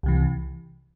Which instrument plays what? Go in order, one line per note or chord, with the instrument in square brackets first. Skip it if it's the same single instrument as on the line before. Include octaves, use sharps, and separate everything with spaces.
[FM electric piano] C2 C3 E3